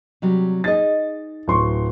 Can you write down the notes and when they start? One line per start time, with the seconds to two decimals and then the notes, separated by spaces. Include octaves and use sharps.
0.22 C3 F#3 G3
0.64 D#4 G#4 D#5 A6
1.48 D1 C6 C#6